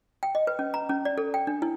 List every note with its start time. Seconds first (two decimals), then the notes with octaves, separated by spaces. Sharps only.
0.23 G5
0.35 D#5
0.47 B4
0.59 C#4
0.74 A#5
0.89 C#4
1.05 D5
1.18 A4
1.34 G5
1.47 D4
1.62 E4